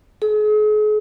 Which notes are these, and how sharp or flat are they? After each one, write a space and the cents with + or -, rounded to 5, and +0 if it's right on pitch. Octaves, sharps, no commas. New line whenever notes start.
G#4 +40